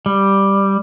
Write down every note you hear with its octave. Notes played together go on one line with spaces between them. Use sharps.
G3